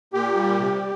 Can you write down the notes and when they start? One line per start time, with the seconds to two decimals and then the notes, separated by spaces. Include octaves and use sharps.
0.13 A#2 G4
0.36 G3
0.59 C3